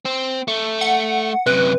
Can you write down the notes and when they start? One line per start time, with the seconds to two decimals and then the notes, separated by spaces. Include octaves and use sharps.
0.05 C4
0.48 A3
0.81 F#5
1.46 F#2 C3 B4